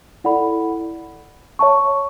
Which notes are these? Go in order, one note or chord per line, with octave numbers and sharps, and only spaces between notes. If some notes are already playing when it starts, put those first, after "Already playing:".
E4 A4 D5 F#5 B5
C#5 E5 A5 C#6